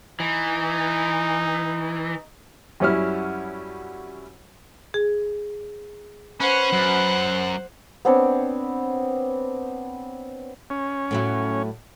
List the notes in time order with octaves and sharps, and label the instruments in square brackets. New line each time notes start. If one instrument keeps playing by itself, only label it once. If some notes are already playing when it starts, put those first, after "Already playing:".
[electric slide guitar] E3 [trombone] D#4
[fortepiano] F#2 G3 C#4 E4 F6
[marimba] G#4
[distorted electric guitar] C#4 [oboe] B4 [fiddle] C5 F#5
[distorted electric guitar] F#2
[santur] B3 C4 D4 C#5
[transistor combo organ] C#4
[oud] A2 F#3 E4